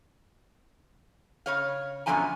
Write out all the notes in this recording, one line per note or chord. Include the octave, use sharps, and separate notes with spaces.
C#3 C#5 F5
F#2 B2 D3 F3 G#5 A#5